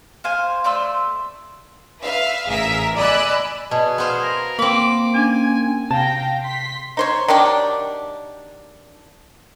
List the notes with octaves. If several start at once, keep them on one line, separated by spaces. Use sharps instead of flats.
C5 F5 G#5
A3 D5 C6 E6
B4 E5 F5
A1 G#4 A#4 E5 B6
D5 D#5 G#5 B5 E6 F#6
B2 G#4 D5 D#5 A5
B3 C5 F5
A#4
A#3 C4 B5 D6
C#4 D4 G#5
C3 F5 G5 A5 A#6
C6 B6
D#4 C5 C#5
D#3 F#3 D4 G4